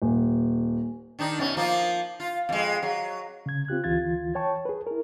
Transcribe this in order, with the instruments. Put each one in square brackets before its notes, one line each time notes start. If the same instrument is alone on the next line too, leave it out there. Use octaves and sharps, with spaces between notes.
[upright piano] D#1
[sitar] D#3 D4 D#4
F#2 B2 C#4
F3 A#3 F4
F4
F2 G#3
F#3
[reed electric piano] C#3 G#6
C4 F4 G4 F#6
D2 E3 F4 G#6 A6
C#5 G5 A5 C#6
G#4 B4
E4 A#4